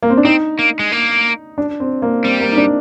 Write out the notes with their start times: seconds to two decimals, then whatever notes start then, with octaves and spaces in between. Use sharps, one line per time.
0.03 A#3
0.10 C4
0.17 D4
0.25 C4 D#4
0.59 A#3
0.79 G#3
0.92 A#3
1.58 D4
1.80 C4
2.02 A#3
2.23 G3 C4
2.41 A#3
2.52 D#4
2.57 D4